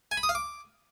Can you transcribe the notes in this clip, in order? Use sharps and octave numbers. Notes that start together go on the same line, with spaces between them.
G#5
B5
D#6
F5
D6